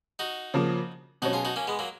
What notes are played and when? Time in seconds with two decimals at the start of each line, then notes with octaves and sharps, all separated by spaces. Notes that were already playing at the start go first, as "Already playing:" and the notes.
0.19 D#4 F#4
0.54 C#3 F3 A#3
1.22 B2 F#3 C#4 D#4 F#4
1.33 F4 G#4
1.45 D#4 F#4
1.56 A#3 C#4
1.67 G#3 B3
1.79 F#3 A#3